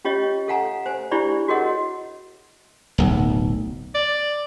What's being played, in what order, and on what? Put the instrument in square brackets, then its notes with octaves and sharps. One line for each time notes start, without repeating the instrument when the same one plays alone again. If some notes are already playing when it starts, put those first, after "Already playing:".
[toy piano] C#4 F4 G4 C#5 D#5
A4 F5 F#5 G#5 A#5
C5 G#5
D4 E4 G4 C5 D5 B5
F#4 G#4 A#4 C#5 D#5 F#5
[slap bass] D1 B1
[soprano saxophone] D5